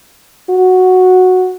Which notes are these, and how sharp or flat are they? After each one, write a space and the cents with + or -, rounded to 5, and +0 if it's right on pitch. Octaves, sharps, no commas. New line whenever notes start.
F#4 -5